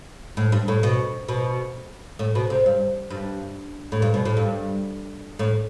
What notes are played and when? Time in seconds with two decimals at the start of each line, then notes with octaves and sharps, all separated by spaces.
0.37 A2
0.52 G2
0.68 A2
0.83 B2
1.29 B2
2.19 A2
2.35 B2
2.50 C3
2.66 G2
3.10 G2
3.92 A2
4.02 G2
4.14 B2
4.25 A2
4.37 G2
5.39 A2